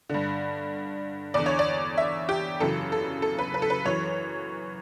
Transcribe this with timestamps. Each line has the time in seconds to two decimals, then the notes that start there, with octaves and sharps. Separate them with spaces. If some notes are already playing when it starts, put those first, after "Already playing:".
0.09 G2 D3
1.34 E2 D3 D5
1.46 C#5
1.59 D5
1.98 E5
2.29 G4
2.60 F#2 C#3 E3 A4
2.92 A4
3.22 A4
3.39 B4
3.54 B4
3.62 A4
3.70 B4
3.85 F#2 E3 C#5